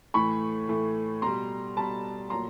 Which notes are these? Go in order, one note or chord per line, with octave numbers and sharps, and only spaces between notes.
A2 E3 A3 B5 C#6
A2 E3 A3
B2 G3 A#5 C6
B2 G3 A5 B5
A#2 F#3 A3 A#5 C6